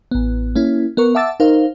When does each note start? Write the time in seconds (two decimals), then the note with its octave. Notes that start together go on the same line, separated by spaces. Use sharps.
0.11 A1 B3
0.55 A#3 C#4 E4
0.97 B3 A#4 C#6
1.15 E5 F#5 A5 D6 E6 A6
1.40 D#4 A#4 C5 F5